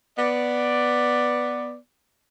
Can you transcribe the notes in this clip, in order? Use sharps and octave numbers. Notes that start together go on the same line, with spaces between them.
B3 D5